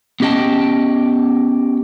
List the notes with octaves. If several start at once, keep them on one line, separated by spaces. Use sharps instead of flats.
B3 C#4 G4 D#5 G5 A5